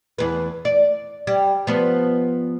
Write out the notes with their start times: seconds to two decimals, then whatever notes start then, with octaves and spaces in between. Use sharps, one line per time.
0.18 E2 B4
0.65 D5
1.27 G3
1.67 F3 B3